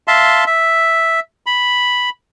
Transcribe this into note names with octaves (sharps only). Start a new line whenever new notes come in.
E5 F5 A5 C6
E5
B5